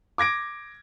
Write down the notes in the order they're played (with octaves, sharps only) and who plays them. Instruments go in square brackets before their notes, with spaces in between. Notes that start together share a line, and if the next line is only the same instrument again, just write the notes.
[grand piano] D6 G#6 A#6 D7